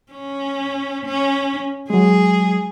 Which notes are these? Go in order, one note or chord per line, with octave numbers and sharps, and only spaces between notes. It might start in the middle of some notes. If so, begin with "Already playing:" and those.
C#4
C#4
F#3 G#3 G#4